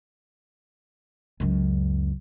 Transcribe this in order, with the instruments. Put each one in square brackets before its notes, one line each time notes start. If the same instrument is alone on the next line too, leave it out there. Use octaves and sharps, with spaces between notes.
[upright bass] C#2 F#2